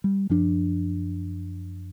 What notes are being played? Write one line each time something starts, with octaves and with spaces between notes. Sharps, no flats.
G3
F#2 F3 D4